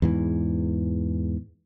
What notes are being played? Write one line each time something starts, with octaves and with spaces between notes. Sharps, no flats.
E2 G#2 E3